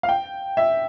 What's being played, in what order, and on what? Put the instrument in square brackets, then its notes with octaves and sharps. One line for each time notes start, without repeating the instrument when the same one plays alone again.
[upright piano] F5
G5
E5